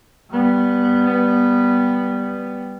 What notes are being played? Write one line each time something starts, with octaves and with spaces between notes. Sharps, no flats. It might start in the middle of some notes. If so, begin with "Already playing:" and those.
G3 B3